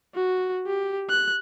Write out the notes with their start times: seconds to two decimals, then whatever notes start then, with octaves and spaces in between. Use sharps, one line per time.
0.15 F#4
0.67 G4
1.10 F#6